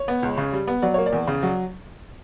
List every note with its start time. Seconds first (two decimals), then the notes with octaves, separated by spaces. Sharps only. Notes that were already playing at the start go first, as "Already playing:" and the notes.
Already playing: C#5
0.08 B3
0.23 C#2
0.37 C#3
0.52 G3
0.67 B3
0.82 F#3 D5
0.94 A#3 C#5
1.06 D5
1.13 E2
1.27 C#3
1.43 F#3